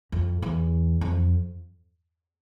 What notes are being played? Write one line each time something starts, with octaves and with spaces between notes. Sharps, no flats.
F2
E2
F2